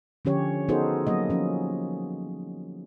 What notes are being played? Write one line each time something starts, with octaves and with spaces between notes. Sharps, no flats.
D3 F3 C#4 G4 C#5
B3 D#4 F#4 G#4 A4 C5
F#3 A#3 D#5
F3 C#4